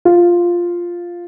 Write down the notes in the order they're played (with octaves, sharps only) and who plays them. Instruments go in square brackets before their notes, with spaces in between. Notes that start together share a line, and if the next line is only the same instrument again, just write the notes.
[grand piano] F4